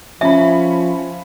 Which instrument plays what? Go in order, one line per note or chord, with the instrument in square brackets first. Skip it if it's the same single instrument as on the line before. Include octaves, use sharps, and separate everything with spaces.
[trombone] F3 [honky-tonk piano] C#4 B5 [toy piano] E5